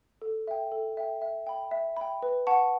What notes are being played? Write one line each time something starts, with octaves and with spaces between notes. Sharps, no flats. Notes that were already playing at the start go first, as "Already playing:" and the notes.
A4
E5 G5
A4
E5 G5
E5
G5 B5
E5
G5 B5
B4
F#5 A5 C#6